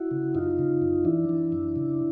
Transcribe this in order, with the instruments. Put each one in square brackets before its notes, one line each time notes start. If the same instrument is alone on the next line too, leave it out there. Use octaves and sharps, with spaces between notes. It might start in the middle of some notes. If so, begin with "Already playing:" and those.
Already playing: [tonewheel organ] E4 F#4
C#3
F#2 D#4 F4
C#3
F#2
E3 D4 E4
E3
F#2
C#3